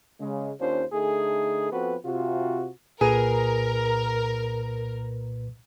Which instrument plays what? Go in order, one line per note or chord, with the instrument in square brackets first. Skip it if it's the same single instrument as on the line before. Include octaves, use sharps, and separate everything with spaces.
[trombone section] C#3 G#3
D#2 C#4 D4 F4 C5
D3 A3 D#4 G#4
F3 B3 C4 F#4 A4 B4
C3 F4 F#4
[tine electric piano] C2 A#2 B4 [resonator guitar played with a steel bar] G#4 [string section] A#4